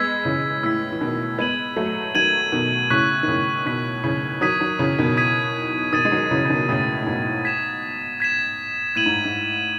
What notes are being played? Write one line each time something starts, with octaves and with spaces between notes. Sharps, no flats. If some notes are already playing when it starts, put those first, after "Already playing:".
Already playing: G#3 B3 E6 G#6 B6
C#3 E3
A2 E6 G#6 B6
E3
B2 D#3
G#3 B3 G#6 D#7 F#7
F#3 A3
D#3 F#3 G#6 D#7 F#7
B2 D#3
A2 C#3 C#6 F#6 B6
D#3
A2 C#3
B2 D#3 C#6 F#6 B6
C#3 E3
D#3 F#3 D#6 G#6 B6 D#7
D#3 F#3
C#3 E3
B2 D#3
D#6 G#6 B6 D#7
B2 D#3 D#6 A6 D#7
G#3
D#3 F#3
C#3 E3
C#3
B2 D#3
A2 C#3 D#6 A6 D#7
A2
G#2 B2
G#6 B6 E7
G#6 B6 E7
A2 G#6 D#7 F#7
G#2
G#2